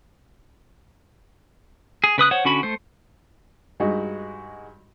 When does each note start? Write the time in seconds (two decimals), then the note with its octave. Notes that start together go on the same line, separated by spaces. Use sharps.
2.04 G#4
2.18 C#3 B4 D#6 F#6
2.31 C5 C#5 F#5
2.45 D3 C#4 F#4 B5
2.63 A3 C5
3.80 G2 G#3 D#4 F#4